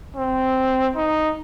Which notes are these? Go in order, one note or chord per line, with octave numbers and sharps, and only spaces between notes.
C4
D#4